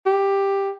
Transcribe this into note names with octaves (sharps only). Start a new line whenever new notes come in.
G4